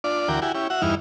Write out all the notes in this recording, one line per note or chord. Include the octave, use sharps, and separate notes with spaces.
D4 F4 D5
D2 E3 F#4 A#4 G5 D6
E4 F#4 G4 G#5
C#4 E4 G4
F#4 E5 F#5
E2 G2 D#4 E4 F6